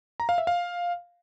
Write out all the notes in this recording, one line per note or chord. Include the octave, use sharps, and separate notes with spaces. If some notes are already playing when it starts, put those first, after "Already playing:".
A#5
F5
E5
F5